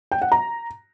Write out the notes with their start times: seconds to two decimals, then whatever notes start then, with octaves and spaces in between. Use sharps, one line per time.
0.12 G5
0.22 F#5
0.32 A#5